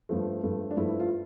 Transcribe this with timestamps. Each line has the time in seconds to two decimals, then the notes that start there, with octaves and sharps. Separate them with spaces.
0.09 G2 F3 A3
0.43 G2 F3 A3
0.71 D4
0.77 G2 F3 A3 E4
0.89 E4
1.00 F4